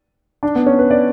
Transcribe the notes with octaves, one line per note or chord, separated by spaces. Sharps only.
D4
B3
C#4
B4
D5